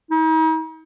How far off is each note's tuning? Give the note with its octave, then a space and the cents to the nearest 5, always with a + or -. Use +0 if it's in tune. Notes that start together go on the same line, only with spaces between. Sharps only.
D#4 +40